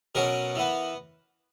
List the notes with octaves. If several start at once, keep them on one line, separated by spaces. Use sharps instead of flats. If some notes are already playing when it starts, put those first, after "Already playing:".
B2 F#3 C#4 A#4
E3 B3